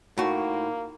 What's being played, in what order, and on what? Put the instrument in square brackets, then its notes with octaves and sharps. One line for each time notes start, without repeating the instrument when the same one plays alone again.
[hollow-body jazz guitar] A2 F#4 [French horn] A#3 [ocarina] D#4